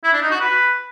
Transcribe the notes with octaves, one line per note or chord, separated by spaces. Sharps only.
E4
D4
D#4
F#4
B4